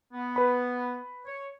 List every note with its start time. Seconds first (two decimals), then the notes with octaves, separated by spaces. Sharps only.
0.13 B3
0.36 B4 B5
1.26 C#5